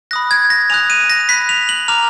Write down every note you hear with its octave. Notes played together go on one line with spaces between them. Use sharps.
B5 D#6 F#6 A#6
G#6
A#6
G#5 D#6 F#6 F7
D#7
A#6
B5 D#6 F#6 B6
F7
F#7
A#5 D6 F6 F7